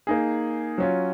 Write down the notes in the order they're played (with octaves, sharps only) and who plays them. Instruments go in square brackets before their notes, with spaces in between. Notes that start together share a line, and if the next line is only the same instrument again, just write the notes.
[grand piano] A#3 D#4 G#4
F#3 C#4 F4